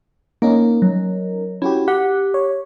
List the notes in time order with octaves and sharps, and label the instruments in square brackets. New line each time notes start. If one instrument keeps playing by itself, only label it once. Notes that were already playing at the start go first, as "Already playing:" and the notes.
[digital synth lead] A#3 [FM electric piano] C#4 D#4 A#4
[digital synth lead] F#3
[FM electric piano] C#4 F#4 G4 [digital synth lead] E4
[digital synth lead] G4 [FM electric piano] F#5
[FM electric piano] C#5